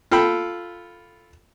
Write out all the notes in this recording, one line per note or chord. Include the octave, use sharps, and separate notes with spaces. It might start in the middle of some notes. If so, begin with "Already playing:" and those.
F4 A4 G5 B5